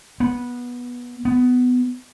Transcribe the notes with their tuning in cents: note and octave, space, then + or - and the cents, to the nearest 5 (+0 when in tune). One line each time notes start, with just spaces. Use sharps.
B3 -15
B3 +15